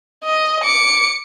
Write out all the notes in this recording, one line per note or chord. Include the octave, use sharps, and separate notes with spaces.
D#5
D6 C#7